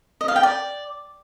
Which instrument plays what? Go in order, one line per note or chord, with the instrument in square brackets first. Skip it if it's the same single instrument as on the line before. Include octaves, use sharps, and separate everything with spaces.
[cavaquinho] D#5
F5
G5
D5